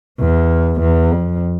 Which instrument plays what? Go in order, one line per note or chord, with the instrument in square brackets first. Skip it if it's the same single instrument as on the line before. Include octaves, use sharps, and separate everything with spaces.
[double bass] E2
E2
F2